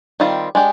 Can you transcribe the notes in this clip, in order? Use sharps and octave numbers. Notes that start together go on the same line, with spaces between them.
D#3 G3 C4 F4
G#3 D4 G4